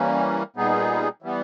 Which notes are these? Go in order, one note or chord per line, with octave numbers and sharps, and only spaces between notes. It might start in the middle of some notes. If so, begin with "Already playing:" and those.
Already playing: E3 G3 A#3 C#4
A#2 G3 B3 D#4 G#4
E3 G3 B3